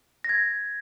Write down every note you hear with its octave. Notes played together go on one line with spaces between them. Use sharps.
A#6
G#6